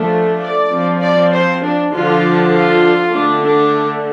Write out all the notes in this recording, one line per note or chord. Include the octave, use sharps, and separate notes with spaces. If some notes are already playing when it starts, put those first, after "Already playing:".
Already playing: F3 A3 D4
D5
F3 C4
D5
C5
D4
D3 F3 D4 F4
F4
D3 A3 D4
D4